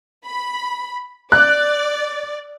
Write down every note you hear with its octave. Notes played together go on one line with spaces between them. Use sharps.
B5
D5 F#6